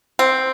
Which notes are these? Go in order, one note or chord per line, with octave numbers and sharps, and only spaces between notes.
C4